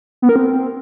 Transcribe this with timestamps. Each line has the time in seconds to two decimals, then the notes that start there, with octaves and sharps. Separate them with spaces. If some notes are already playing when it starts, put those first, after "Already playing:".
0.22 B3
0.29 A#4
0.36 C4